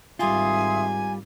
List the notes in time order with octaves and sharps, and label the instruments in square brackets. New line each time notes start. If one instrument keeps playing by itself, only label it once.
[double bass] G#1 [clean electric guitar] G3 F4 [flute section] E5 C6 D#6 [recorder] G#5